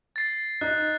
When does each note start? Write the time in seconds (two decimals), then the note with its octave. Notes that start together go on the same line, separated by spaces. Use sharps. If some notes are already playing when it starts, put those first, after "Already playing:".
0.16 A6 C7
0.61 D#4 F#6